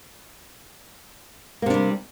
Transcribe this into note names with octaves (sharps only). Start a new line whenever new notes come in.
C3 G3 A#3 D4